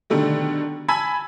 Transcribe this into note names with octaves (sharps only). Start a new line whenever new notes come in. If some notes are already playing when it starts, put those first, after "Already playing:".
B2 D3 D#3 G3 A3
G#5 A5 B5 E6 G#6 B6